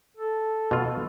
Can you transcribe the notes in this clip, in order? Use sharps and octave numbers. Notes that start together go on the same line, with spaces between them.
A4
B2 F4